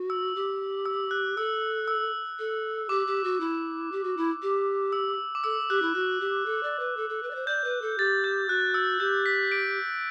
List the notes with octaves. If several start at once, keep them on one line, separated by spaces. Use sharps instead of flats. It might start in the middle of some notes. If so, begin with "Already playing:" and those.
Already playing: F#4
E6
G4
E6
F#6
A4 E6
E6
A4
G4 D6
G4
F#4
E4
G4
F#4
E4
G4
E6
D6
A4 E6
G4 F#6
E4
F#4 F#6
G4
A4
D5
B4
A4
A4
B4
D5
C5
D5 G6
B4
A4
G4 A6
G6
F#4 F#6
E6
G4 G6
B6
D7